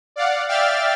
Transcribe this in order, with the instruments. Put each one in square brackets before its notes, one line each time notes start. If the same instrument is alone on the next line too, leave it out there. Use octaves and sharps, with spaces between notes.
[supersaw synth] D5 F5 F#5
D5 E5 F5 G5 F6 A6